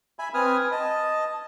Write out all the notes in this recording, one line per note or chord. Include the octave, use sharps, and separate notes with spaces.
E5 G#5 B5
C4 B4 G#5 D#6 F6
D#5 A5